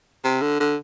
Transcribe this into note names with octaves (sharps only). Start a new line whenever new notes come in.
C3
D3
D3